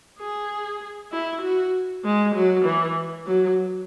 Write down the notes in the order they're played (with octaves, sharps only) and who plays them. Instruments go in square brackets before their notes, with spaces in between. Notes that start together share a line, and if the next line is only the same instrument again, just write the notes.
[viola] G#4
E4
F#4
G#3
F#3
E3
F#3